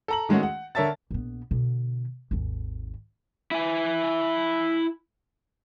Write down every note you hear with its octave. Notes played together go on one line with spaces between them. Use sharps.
A4 A#5 F#7
D#3 G#3 A3 C#4 F#4
F#5
D3 A#4 C#5 E5 A5 A6
A#1 B3
B2 D3
G#1 D#2
E4 G#5